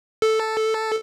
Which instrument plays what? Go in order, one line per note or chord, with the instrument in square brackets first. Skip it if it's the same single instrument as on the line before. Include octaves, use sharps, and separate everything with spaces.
[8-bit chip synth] A4